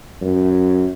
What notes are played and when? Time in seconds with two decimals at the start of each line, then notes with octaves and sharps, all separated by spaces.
0.22 F#2